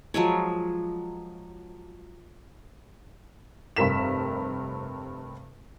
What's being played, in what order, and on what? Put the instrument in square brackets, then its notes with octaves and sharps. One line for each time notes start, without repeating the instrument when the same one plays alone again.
[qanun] F3 F#3 G#3 C#5
[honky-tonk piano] F1 G2 C3 A#4 B6 E7